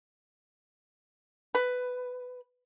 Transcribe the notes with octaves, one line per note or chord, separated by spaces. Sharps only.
B4